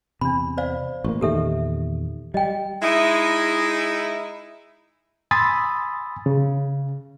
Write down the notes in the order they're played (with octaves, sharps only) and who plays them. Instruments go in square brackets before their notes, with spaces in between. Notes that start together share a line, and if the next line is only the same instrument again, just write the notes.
[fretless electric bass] E2 C3 [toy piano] D4 B5
[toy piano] C5 D5 F5
[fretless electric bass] A1 A#3 [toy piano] C#6
[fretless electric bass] E2 A#2 D#3 [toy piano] G4 A4 E5
[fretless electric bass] G3 [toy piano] D#5 G5
[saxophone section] G#3 D#4 E4
[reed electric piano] G#5 B5 C6 D#6 E6 A6
C#3